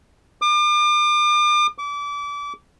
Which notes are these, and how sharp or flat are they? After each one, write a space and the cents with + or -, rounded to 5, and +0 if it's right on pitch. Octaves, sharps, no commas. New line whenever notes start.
D6 +40
D6 -30